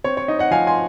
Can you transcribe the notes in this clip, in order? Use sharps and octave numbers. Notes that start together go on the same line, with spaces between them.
C4 C#5
C#5
D#4 D#5
D#5 F#5
F3 F5 G#5
G#5 C6